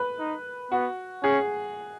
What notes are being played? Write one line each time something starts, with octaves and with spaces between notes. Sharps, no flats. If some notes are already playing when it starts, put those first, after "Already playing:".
Already playing: B4
D#4
B3 F#4
C#4 G#4